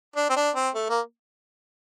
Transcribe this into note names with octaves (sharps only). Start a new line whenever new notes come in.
D4
C4
D4
C4
A3
A#3